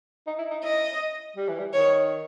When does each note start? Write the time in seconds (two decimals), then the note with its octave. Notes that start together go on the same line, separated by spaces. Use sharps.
0.27 D#4
0.39 E4
0.51 D#4
0.63 E4 D#5
1.36 G3
1.48 E3
1.59 G3
1.73 D#3 C#5